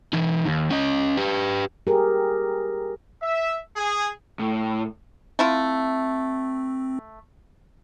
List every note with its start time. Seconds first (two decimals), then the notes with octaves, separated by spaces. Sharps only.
0.13 E3 D#4
0.46 D#2
0.71 C#4 D#5
1.17 G4 B4
1.87 G4 G#4 A#4
3.22 E5
3.76 G#4
4.39 A2
5.39 A3 C4 E4 F4